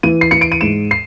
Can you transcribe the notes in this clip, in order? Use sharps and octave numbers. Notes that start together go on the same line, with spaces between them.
E3 D#7
C7
E3 C#7
D7
D#7
G#2 E7
C7